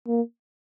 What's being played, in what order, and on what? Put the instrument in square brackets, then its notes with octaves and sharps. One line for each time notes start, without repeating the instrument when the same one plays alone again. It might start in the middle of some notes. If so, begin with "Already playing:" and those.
[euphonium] A#3